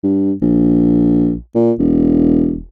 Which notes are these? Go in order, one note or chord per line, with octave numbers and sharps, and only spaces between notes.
G2
A#1
A#2
E1